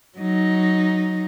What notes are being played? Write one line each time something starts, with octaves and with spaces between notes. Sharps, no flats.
F#3 D#4